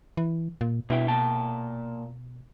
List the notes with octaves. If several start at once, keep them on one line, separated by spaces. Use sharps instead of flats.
E3
A#2
G2 B2 E4 G5
A#2 G5 A5